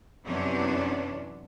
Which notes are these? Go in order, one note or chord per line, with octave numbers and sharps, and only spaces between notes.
F#2 C3 E3 B3 C#4 D4